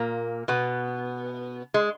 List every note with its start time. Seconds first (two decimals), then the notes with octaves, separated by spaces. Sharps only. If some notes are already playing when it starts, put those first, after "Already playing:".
Already playing: A#2 A#3
0.48 B2 B3
1.74 G#3